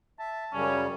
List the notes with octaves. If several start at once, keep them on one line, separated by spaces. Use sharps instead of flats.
E5 A5
F#2 C#3 G3 C#4